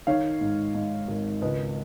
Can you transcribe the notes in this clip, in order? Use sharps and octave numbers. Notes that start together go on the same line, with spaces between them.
D#3 C#5 F5
G#2
G#2
G#1
C#2 B4 D#5